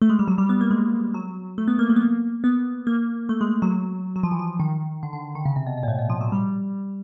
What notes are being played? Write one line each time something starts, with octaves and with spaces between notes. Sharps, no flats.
A3
G#3
G3
F#3
G3
B3
A#3
G#3
F#3
A3
B3
A#3
A3
B3
A#3
B3
A#3
A3
G#3
G#3
F#3
F#3
F3
E3
F3
D#3
D3
D3
D#3
C#3
C3
B2
B2
A#2
A2
B2
F3
F#3
G3